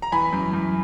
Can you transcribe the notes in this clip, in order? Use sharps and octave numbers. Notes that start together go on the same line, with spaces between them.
A#5
E3 G#5 B5
F#2
F#2